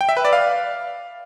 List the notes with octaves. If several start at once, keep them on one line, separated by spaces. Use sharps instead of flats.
G5
E5
B4
D5
F5